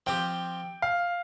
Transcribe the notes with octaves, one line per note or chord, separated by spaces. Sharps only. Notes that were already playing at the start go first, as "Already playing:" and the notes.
F3 C4 G4 G5
F5